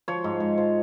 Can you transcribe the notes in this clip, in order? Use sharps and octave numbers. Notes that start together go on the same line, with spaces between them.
F3 C#5
G#2
G#2
F3